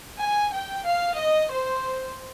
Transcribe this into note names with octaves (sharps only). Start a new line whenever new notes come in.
G#5
G5
F5
D#5
C5